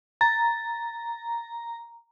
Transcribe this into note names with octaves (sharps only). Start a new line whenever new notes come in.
A#5 A6